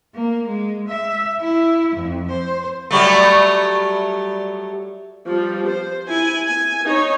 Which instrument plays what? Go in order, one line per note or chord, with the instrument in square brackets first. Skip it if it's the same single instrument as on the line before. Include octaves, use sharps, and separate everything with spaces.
[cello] A#3
G#3
E5
E4
F2
C5
[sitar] F#3 G3 A3
[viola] F3 G3
C5
E4 G#5
G#5
D#4 C#5